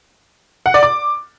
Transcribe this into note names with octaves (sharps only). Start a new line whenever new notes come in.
F#5
D5
D6